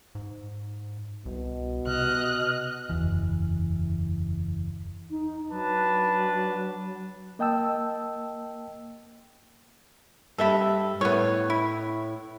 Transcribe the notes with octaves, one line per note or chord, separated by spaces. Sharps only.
G#2
C2 B2
C3 D#5 F6 F#6
F#1 E2 E3
D#4
F#3 D4 B4 A5
A#3 D#5 G5 A5 E6
G2 A4 E5 B5
A2 B3 C#5
E4